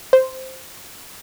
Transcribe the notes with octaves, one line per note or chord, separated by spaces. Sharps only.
C5